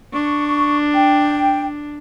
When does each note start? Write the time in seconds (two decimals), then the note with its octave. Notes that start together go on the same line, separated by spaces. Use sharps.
0.13 D4 C#6
0.95 G5